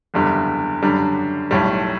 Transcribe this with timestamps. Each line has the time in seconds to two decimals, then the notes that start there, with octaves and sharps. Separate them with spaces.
0.14 F#1 E2 D3 G3
0.82 F#2 D3 G3 D4
1.51 B1 A2 G3